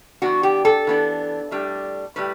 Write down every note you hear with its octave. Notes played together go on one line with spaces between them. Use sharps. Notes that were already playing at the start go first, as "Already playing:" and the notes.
E3 B3 D4 F#4
G4
A4
E3 B3 D4
A2 G3 D4
A2 G3 B4